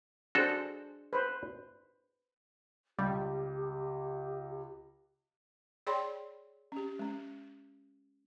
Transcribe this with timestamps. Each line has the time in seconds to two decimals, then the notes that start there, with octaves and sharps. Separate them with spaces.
0.35 D4 F#4 G#4 A4 C5
1.13 B4 C5
2.99 C#2 G3 G4
5.87 G#4 C#5 D5 G5 B5 C6
6.72 C#4 G4
6.99 G#3 C#4